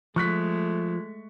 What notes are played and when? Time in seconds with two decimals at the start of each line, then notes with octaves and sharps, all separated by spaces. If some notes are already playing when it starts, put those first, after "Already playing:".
0.16 F3 G#3 A3 C#6 F#6 B6